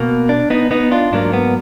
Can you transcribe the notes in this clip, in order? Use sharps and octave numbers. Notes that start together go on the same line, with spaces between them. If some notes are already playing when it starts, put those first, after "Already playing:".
Already playing: B2 A#3
D4
B3 D#4
B3 D#4
D4 F4
G#2 F#3 A#3 D4
B3